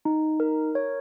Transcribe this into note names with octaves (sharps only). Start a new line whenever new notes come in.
D#4
A#4
C#5